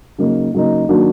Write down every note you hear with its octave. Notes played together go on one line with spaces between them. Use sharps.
C#3 F#3 A#3 D#4
C#3 F#3 A#3 D#4
D#3 F#3 A#3 D4 F#4